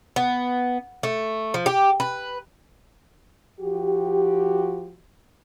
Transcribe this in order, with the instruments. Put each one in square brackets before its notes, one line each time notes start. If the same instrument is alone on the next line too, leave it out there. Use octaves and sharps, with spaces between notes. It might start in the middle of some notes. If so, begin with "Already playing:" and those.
[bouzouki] B3
A3
F3
G4
B4
[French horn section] F3 F#4 G4